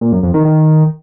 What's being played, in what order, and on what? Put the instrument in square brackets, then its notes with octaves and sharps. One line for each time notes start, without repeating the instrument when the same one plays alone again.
[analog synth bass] A#2
F#2
F2
D#3
D#3